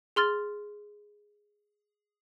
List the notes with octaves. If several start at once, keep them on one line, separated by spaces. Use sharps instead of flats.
G#4 C6 F6 A6